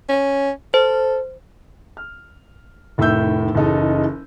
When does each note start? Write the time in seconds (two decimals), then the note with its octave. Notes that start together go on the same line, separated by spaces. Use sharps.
0.09 C#4
0.74 A4 C5
1.97 F6
2.98 F1 A2 D#3 E5 E6 G6
3.55 F#1 C#3 E3 D#4 A4 D#5